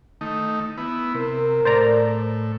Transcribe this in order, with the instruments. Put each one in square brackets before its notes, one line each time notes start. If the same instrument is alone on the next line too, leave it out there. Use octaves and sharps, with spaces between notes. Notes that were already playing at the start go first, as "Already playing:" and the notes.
[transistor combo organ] D#3 A3 D#4
B3 E4
[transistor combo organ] C3 [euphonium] A#4
[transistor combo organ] A2 [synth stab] C5 D5 A#5